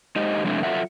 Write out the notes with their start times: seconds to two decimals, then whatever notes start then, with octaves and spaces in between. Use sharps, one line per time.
0.16 G#3 D#4 G4 C5 D#5
0.44 F2 C3 G#3 A3 D4 E4
0.63 F#3 F4 A4 E5 F#5